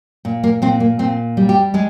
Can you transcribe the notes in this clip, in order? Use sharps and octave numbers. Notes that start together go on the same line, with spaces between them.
A#2
A#3
A#2 C4
A#3
A#2 C4
G3
G4
G#3 G#4